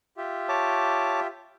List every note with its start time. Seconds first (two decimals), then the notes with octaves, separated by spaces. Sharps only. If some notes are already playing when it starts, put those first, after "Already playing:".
0.17 F4 G4 E5
0.49 C#5 A5 D6